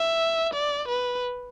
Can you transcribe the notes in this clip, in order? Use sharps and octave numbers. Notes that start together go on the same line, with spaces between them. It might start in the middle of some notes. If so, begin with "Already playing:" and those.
Already playing: E5
D5
B4